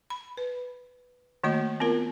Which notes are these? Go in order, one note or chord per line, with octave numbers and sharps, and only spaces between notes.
B5
B4
D#3 A3 A#3 F#4 D#5
B3 C4 F4 A#4